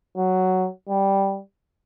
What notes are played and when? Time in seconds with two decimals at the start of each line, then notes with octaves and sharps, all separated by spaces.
0.17 F#3
0.89 G3